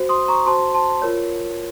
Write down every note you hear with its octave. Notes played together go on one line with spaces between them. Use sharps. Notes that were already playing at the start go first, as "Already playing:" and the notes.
Already playing: F#4 C5
C6 D#6
A#5 C#6
F#4 C5 A5 C6
A5 C6
F4 A#4 C#5